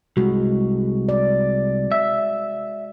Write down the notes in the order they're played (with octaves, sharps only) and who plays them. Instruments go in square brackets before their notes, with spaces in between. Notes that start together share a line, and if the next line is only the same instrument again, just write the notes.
[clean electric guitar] C2 [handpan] G#3 F#4
[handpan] D5
[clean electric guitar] E5